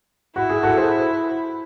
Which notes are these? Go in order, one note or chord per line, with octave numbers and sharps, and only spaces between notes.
E4 F#4
G#4
F#4 A4
G#4 C5